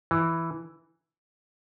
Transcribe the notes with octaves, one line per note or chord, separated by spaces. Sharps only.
E3